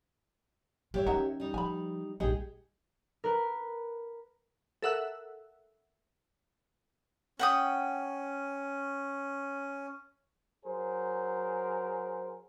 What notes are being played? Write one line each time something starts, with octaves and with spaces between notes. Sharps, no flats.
G#3 G4 C#5 E5
E3 C#4 D#4 F#4 A#4
G3 D#4
F3 G#5 B5
A#1 G2 D#4 G4 G#4 D#5
A#4 B4
A4 A#4 E5 F#5 E6 F#6
C#4 F#5 G5 D#6
F#3 G#4 A#4 C5